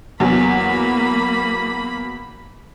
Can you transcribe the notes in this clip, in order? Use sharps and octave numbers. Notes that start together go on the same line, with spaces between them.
E2 F#3 A#3 B5